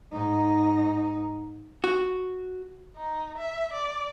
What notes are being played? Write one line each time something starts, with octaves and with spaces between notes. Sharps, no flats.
G#2 D#4
F#4
D#4
E5
D5